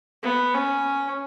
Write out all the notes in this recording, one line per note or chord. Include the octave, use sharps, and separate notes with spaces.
B3
C#4